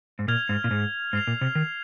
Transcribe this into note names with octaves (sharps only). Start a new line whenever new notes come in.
G#2
A#2 F6 G#6 F7
G#2
A#2
G#2
G#2 F6 C7 F7
A#2
C3
D#3